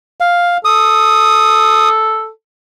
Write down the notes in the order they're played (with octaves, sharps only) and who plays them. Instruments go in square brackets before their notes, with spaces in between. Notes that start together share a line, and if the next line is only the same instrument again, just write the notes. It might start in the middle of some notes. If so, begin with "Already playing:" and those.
[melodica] F5
[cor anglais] A4 [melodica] D#6